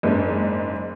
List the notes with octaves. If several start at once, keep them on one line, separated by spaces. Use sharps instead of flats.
F#1 G#2 D4